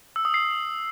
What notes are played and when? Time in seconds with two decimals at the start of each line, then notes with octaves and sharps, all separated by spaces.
0.16 E6
0.25 D#6
0.34 C7